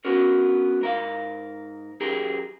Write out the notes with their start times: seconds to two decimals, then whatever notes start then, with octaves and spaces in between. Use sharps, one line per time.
0.05 B3 C#4 D4 F#4 A#4
0.81 G#2 A#4 F5
2.00 F#2 G4 G#4 A#4